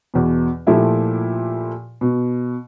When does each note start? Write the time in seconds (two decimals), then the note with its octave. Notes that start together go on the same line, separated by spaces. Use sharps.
0.14 E2 B2
0.67 A#2 F3 A3 E4 G4
2.01 B2